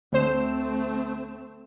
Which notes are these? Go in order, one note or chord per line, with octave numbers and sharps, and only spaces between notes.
D2 A3 C4 C5 E7